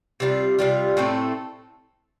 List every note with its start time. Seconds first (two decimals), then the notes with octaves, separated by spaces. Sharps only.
0.20 C3 G3 F4
0.59 C3 G3 F4
0.97 A2 A3 C4 A4